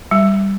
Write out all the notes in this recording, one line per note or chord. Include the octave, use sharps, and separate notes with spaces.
G3